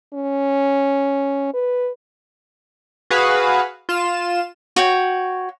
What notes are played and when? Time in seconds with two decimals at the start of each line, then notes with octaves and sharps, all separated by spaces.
0.13 C#4
1.54 B4
3.10 F#4 G#4 B4 F5
3.89 F4 E7
4.76 F#4 C#5 G5